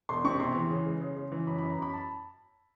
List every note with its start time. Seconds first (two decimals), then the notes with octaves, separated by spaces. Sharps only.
0.09 E1 C6
0.24 C3 C#6
0.40 E2 C6
0.55 E3
0.70 C#3
0.86 G#3
1.01 C#3
1.16 C#3
1.32 E3
1.47 F#2 B5
1.58 F#2 B5
1.70 A#5
1.78 F#2 B5
1.93 A5